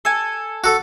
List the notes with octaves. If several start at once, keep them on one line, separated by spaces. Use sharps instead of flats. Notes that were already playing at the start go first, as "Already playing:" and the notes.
A4 G#5
F#4 A4